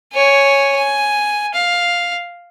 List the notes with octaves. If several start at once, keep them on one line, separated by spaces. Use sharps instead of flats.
C#5 G#5
G#5
F5